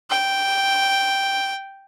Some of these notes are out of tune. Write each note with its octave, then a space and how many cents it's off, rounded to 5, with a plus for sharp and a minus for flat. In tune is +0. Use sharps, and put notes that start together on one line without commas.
G5 +0